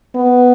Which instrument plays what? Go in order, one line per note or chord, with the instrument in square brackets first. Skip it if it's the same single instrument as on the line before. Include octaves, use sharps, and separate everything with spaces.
[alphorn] B3